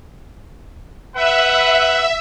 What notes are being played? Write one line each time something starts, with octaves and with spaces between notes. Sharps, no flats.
B4 E5 F#5